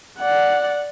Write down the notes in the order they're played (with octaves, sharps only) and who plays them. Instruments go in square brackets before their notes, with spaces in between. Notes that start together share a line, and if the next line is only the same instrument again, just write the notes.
[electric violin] D5 F#5